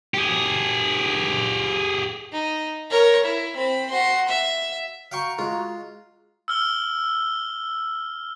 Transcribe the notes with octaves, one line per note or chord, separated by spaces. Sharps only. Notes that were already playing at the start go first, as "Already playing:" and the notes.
G4 G#4
D#4
A#4 C#5
E4
C4 B5
F#4 C6
E5
F#4 F5 G5 A#5 C#6
G#3 F4
E6 F6 G7